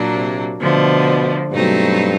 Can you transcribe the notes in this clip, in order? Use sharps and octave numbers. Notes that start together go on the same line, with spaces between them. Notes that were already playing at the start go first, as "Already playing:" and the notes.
Already playing: A#2 F#3 A#3 D4
C3
B2 D3 F3 A3
G2 B2 F#3 A3 C4 D#4